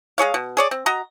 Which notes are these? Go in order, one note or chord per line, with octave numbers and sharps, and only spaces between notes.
G#3 G#4 C#5 F5
B2
G#4 C#5 D5
C4
F#4 D#5 A#5